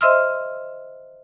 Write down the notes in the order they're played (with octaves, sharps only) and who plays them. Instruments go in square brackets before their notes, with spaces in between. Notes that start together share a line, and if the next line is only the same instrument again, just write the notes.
[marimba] C5 D#5 E5 C6 E6 F6